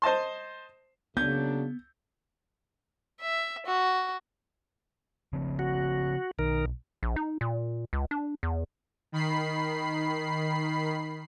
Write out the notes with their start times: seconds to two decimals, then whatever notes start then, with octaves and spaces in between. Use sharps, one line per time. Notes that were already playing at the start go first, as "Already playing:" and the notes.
0.02 C5 D#5 A5 C6
1.17 C#3 F#3 A#3 B3 D4 G6
3.21 E5
3.66 F#4
5.33 C#3 F3 C4
5.59 F#4
6.39 B1 D#3 A#4
7.03 A#1
7.16 D#4
7.41 A#2
7.93 C#2
8.11 D4
8.43 E2
9.12 D#3 B5 C7